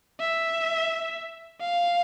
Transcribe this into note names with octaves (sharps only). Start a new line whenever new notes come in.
E5
F5